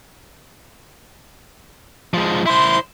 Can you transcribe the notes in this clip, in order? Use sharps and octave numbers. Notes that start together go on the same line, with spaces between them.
F3 G#3
E4 C5 C6